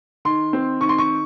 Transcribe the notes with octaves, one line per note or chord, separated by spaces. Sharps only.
D#3 C6
C4
D#3 C#6
C6
C#6